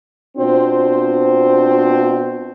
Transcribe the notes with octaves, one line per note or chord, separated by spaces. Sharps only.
B2 C4 D4 F4 C5